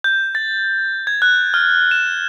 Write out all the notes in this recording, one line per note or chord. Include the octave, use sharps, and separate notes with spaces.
G6
A6
G#6
F#6
F6
E7